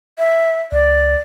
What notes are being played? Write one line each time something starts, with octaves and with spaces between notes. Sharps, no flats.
E5
C#2 D5